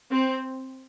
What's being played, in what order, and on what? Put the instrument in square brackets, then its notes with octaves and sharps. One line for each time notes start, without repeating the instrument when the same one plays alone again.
[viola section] C4